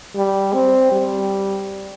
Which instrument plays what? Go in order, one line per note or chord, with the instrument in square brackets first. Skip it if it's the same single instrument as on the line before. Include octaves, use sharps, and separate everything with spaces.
[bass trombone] G3
C4
G3